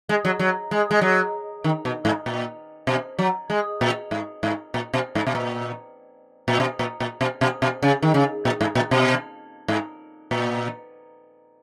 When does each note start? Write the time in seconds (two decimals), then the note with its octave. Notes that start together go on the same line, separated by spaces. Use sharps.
0.09 G#3
0.25 F#3
0.39 F#3
0.71 G#3
0.91 G#3
1.01 F#3
1.64 D#3
1.85 B2
2.05 G#2
2.26 A#2
2.87 B2
3.19 F#3
3.50 G#3
3.81 A#2
4.11 G#2
4.43 G#2
4.74 A#2
4.94 B2
5.15 G#2
5.27 B2
5.35 A#2
6.48 A#2
6.60 B2
6.79 A#2
7.00 A#2
7.21 B2
7.41 B2
7.62 B2
7.83 C#3
8.02 D#3
8.14 C#3
8.45 A#2
8.61 G#2
8.75 A#2
8.91 B2
9.68 G#2
10.31 A#2